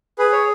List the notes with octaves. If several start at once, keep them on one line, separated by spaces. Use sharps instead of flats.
G#4 B4
C#5